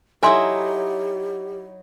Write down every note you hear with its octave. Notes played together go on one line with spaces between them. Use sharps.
F#3 D#4 E4 G4 A4 E5 G#5 C6